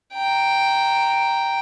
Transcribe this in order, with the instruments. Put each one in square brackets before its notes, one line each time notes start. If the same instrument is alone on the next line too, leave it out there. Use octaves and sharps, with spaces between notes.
[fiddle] G5 A#5